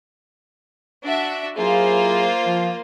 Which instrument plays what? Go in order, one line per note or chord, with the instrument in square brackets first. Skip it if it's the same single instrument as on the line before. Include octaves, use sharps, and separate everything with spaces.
[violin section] D4 F#4 E5
[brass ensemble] F#3 E4 G#4 [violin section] A#3 F4 C5
[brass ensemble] F3